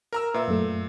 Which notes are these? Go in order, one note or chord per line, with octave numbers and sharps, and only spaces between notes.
A#4 A#5 E6
A#2 B4 E5
F#2 A3